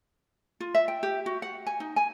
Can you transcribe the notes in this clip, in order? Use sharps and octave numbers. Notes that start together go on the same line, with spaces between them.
F4
E5
G5
G4
F#4
F#5
G#5
D#4
G#5